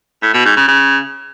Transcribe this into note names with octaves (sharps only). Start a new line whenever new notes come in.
A2
B2
G#2
C#3
C#3